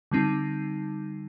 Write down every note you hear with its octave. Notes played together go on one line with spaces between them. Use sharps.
D3 G3 C4 D#4